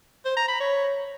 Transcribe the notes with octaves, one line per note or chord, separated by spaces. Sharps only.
C5
A#5
B5
C#5